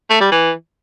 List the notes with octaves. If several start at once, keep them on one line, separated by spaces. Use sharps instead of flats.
A3
G3
E3